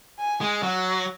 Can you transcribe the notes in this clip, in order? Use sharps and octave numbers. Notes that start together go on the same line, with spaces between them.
G#5
G#3
F#3 F#5